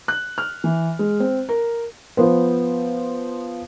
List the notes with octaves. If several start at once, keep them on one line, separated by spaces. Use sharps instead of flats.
F#6
F6
E3
G#3
C4
A#4
F3 B3 C5